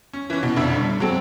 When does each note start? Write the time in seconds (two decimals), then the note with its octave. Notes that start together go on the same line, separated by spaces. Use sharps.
0.13 C#4
0.30 E3 C#4
0.43 B2
0.56 F1 B2 D3 E5
0.76 G2
1.00 F#3 G#3 C4 A4